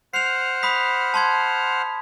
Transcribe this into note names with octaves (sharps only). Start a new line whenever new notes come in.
C5 F#5 F6 C7 F7
B5 D#6 B6
A5 C6 G#6